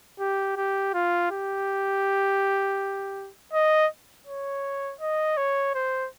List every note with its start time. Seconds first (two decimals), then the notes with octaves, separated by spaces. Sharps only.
0.20 G4
0.57 G4
0.94 F4
1.31 G4
3.53 D#5
4.27 C#5
5.01 D#5
5.37 C#5
5.75 C5